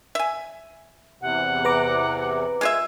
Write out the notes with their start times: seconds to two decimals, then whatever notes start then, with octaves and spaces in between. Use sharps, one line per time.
0.15 E5 G#5
1.22 E2 C3 F#5
1.65 B4 A#5 D6
2.61 G#3 F4 E5 G#6